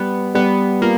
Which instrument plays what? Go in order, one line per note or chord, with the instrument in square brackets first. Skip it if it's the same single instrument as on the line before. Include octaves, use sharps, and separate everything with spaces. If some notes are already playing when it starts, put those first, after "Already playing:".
Already playing: [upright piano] G3 [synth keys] B3
[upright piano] G3 [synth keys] B3
[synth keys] A#3 [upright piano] F4